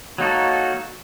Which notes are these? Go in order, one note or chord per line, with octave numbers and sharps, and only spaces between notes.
F#3 A#3 D#4 F#4 A4